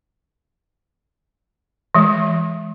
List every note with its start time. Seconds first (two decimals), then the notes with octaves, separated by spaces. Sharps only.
1.95 E3 G#3